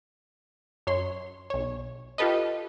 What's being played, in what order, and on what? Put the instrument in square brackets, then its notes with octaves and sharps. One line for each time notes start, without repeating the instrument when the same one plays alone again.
[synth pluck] F#2 C#5 C6
B1 C#5
F4 G4 A4 B4 D#5